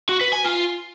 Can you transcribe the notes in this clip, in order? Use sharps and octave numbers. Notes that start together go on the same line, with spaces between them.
F#4
B4
G#5
F4